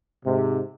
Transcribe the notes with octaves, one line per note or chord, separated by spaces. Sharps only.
G#2 C3